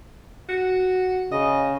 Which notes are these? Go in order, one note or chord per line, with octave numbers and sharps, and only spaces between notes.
F#4
C#3 D#5